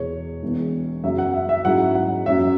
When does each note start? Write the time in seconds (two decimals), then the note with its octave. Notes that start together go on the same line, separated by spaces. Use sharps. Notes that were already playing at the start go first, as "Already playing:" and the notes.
Already playing: E2 B2 G#3 C#5
0.43 E1 E2 B2
1.03 F#2 C#3 F#3 E5
1.18 F#5
1.34 E5
1.49 E5
1.65 G#2 F#3 C#4 E4 F#5
1.95 F#5
2.26 F#2 F#3 C#4 E5